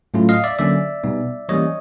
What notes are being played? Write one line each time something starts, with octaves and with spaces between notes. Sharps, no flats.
A2 F#3 A3 C#4 F4
D#5 F5
D5 E5
D3 F#3 A#3 C#4 D5 E5
B2 G3 B3 D#4
E3 G3 A#3 C#4 C#5 D#5